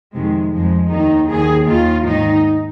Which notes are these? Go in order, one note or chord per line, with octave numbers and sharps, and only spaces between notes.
F2 C3 D#3 G#3
F2 F3 G#3
D#2 D#3 D#4
D#2 D#3 G#4
D#2 D#3 F4
G#2 D#3 D#4